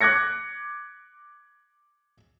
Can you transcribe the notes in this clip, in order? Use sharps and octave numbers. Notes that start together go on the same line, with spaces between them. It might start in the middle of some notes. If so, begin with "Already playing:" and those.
D6 F#6 G#6 A#6 C#7